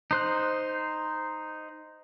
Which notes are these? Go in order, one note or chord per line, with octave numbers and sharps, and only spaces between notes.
D#4 C5 F#6